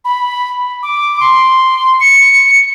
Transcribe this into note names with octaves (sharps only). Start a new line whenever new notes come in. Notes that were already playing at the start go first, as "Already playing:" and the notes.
B5
D6
C6
C#7